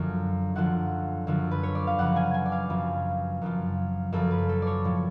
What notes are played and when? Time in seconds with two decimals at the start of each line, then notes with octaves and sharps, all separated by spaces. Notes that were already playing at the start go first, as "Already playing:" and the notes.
Already playing: F#2 D3 F3
0.55 F#2 D3 F3 F#5
1.27 F#2 D3 F3
1.51 B4
1.63 C#5
1.75 D5
1.87 F5
1.98 F#2 C#3 F3 F#5
2.16 G#5
2.34 G#5
2.46 D5
2.52 F5
2.70 F#2 C#3 F3
3.42 F#2 C#3 F3
4.12 F#2 C#3 F3 A4
4.31 B4
4.49 A4
4.62 C#5 D5
4.84 A2 F3